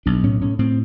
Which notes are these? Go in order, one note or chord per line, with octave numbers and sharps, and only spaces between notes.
B1 D4
A2 C#4
A2 C#4
A2 C4